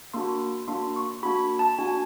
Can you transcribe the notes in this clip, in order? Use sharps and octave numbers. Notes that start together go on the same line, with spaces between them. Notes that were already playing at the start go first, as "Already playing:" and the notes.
A#3 D4 F#4 C6
A#3 D4 F#4 C6
C#6
A#3 D4 F#4 B5
A5
A#3 D4 F#4 G#5